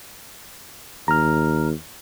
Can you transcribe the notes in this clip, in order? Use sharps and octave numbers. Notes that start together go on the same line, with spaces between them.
D#2 A#5 F6